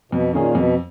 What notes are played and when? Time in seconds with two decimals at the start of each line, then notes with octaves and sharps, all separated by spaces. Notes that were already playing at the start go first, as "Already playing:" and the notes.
0.12 F2 B2
0.33 A#2 D#3 A#3 C#4 G#4
0.55 F2 B2